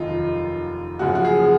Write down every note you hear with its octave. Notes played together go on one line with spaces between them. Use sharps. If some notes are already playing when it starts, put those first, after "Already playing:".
Already playing: F1 D#2 D#3 F#3 D#4 F4
F#1 F#2 C#3 F3 F#4
F#4
G#4